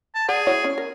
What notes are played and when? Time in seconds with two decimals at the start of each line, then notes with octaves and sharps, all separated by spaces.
0.14 A5
0.28 G#4 D5 F#5
0.47 E4 F#4 C#5
0.64 C#4
0.78 A#4